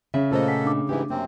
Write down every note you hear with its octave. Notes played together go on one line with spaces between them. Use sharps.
C#3 E5
A#2 A3 A#3 F4 A4 C5 D#5
F#5 G#5 B6
D4 D6
G#2 E3 E4 G4
F#2 C3 A#3 C4